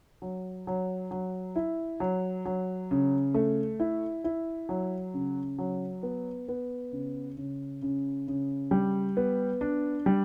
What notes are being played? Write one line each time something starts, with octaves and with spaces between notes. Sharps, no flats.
F#3
F#3
F#3
E4
F#3
F#3
C#3
A3
E4
E4
F#3
C#3
F#3
B3
B3
C#3
C#3
C#3
C#3
G3
B3
D4
G3